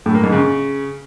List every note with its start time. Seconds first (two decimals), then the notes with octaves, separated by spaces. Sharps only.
0.06 A2
0.15 A#3
0.23 G#2
0.32 C#3